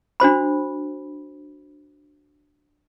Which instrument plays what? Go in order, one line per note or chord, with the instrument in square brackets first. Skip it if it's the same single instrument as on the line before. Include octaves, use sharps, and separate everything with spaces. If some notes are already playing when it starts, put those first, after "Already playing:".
[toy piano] D4 F#4 C5 B5